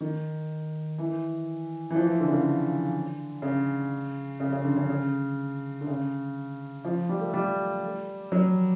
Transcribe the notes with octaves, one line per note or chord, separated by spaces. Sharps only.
D#3
E3
E3
F3
E3
D3
C#3
D3
C#3
C#3
C#3
D3
C#3
C#3
D3
C#3
F3
G3
A3
G3
F#3